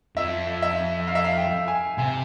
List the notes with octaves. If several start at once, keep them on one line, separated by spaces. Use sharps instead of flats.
F2 E5
E5
F5
E5
F5
G5
G#5
C3 G#5